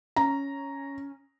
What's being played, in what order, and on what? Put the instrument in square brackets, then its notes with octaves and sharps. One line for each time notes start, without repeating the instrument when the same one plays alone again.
[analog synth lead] C#4 [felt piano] A#5